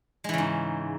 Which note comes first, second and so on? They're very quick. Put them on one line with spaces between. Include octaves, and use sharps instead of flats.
G#3 E3 C#3 G#2